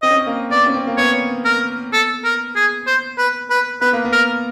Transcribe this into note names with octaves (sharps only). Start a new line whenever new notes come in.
C4 D#5
C#4
C4
A#3
B3 D5
C#4
C4
A#3
B3 C#5
A#4
A4
A#4
G#4
C5
B4
B4
B3 B4
A#3
B3
A#4